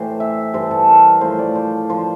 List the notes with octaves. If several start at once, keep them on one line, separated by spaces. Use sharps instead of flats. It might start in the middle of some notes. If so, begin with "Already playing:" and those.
Already playing: A2 E3 G4 C5
E5
G2 E3 C5
A4
A#4
A2 F3 C5
D5
C5
F3 C5